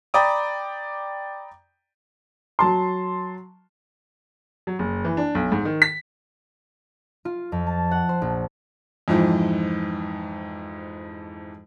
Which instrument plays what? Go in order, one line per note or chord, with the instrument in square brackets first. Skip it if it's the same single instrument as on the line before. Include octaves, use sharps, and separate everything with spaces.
[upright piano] D5 G5 A#5 B5 D6 D#6
F#3 A5 C6
[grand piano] F#3
F#1
E3
D4
B1
G#2
D#3
B6
[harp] F4
F2
A5
F#5
C5
A#1
[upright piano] F2 G#2 E3 F3